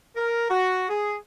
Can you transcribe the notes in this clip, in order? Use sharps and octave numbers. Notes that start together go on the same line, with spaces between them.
A#4
F#4
G#4